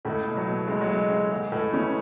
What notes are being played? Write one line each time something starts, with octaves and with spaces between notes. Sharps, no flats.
C#2 A2 A3
B2
F#3
B2
C#2 G#3
F#3
B2 G#3
C#2 G#3
A1 G#3
A1 A2 A3
C#3 E3 C#4